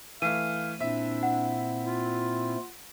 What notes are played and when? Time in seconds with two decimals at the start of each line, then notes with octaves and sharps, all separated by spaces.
0.22 E3 A3 F5 D#7
0.80 A#2 C4 D4 E4 E5
1.23 F#5
1.83 F4